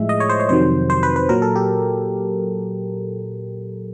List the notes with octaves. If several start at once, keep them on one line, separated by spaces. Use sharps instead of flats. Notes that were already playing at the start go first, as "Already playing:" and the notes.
Already playing: A2 F3 G#3 E5
D#5
C#5
C5
C#5
F2 C3 D#3 F#3 C5
C5
B4
B4
A#2 F#3 A#4
A4
G4